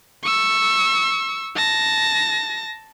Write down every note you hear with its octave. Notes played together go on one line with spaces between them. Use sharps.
C#6 E6
A5 A#6